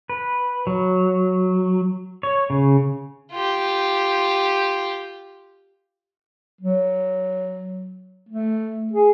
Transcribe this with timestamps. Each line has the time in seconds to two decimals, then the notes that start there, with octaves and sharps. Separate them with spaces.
0.09 B4
0.67 F#3
2.23 C#5
2.50 C#3
3.32 F4 G4
6.61 F#3
8.29 A3
8.93 G#4